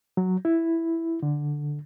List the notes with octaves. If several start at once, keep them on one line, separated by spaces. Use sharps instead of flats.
F#3
E4
D3